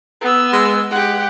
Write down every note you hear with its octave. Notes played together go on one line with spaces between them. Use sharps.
B3 E6
G#3
G#3 G4 F#5